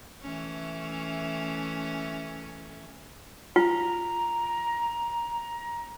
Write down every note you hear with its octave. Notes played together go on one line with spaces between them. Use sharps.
E3 A3 C#4
F4 A#5